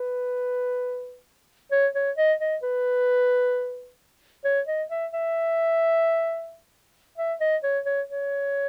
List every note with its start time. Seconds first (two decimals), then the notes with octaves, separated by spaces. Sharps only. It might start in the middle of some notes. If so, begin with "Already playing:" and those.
Already playing: B4
1.72 C#5
1.95 C#5
2.18 D#5
2.40 D#5
2.63 B4
4.45 C#5
4.68 D#5
4.91 E5
5.13 E5
7.18 E5
7.41 D#5
7.64 C#5
7.86 C#5
8.09 C#5